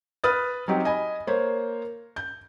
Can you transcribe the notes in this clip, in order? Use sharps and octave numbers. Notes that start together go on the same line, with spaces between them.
B4 B5 D#6 F6 A6
F#3 C4 D#4 G4
D#5 G#5 B5
A#3 C5 C#5
G6